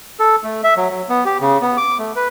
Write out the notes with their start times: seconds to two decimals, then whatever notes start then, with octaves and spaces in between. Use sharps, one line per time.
0.20 A4
0.44 A3
0.64 E5
0.77 F#3
0.90 F#3
1.09 B3
1.25 G4
1.41 C#3
1.61 B3
1.77 D6
1.99 A3
2.16 B4